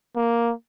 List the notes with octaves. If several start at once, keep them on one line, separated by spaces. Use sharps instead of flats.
A#3